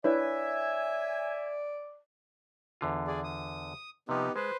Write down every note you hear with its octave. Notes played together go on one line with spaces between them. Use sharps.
D4 E4 B4 C#5 D5 E5 G#5
E2 D3 F4
G#4 D5
D#6
C3 F3 B3 D#4 G4
G#3 B4 C5